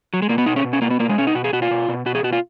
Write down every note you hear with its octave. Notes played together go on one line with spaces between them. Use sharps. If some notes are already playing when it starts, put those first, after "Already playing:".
F#3
G#3
B2 A#3
B3
B2 D#4
C#4
B2
C#4
B2 A#3
B3
B2 A#3
G#3
B2 C#4
D#4
B2 F#4
G#4
B2 F#4
F4
B2
B2
B2 F#4
G#4
B2 F#4
F4